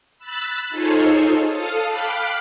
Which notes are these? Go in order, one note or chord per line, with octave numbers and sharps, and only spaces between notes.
B5 E6 F#6 A6
D#4 F4 G#4 A4 C5 C#5
A4 F5 A5 D#6
F5 G5 B5 D6 F6 F#6